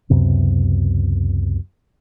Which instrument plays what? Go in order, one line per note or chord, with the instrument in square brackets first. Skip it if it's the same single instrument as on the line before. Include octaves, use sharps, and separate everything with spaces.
[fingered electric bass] C#2 F#2 C3 B3